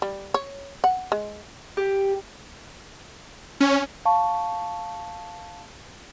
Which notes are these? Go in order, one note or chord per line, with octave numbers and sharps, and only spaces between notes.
G3
C#5
F#5
G#3
G4
C#4
F5 A5 C#6